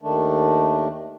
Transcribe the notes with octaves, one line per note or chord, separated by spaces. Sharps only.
D#2 D#3 A3 D4